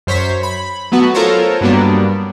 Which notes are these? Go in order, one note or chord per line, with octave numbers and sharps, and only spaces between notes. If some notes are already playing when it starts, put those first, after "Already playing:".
F#2 C5 C#5 B6
B5
F#3 A3 B3 F#4
F4 A4 A#4 C5 C#5 A#5
G2 F#3 G3 A#3 B3 D4